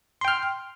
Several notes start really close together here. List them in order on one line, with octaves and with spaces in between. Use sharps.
C6 G5 F6